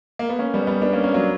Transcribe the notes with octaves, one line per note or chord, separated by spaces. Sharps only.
A#3
B3
A#3 C#4
G3 B3
G3 B3
B3 D4
A#3 C#4
A#3 C#4
F#3 A#3